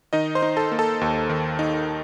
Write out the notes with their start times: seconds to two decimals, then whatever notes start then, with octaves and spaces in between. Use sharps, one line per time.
0.13 D#3 D#4 D#5
0.35 C5 C6
0.42 D#4
0.57 A4 A5
0.72 A#3
0.79 A4 A5
1.01 D#2
1.29 D#3
1.59 D#4